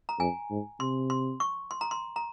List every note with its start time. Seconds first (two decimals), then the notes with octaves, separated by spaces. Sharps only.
0.09 A#5
0.19 F2 G#5
0.50 G#2
0.80 C3 C6
1.10 C6
1.40 C#6
1.71 C6
1.81 A#5
1.91 C6
2.16 A#5